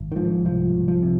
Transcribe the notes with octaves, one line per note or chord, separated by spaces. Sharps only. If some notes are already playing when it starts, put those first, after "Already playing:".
Already playing: G#1
D#3
G#2 F3
C2 F3
C2
F3
C3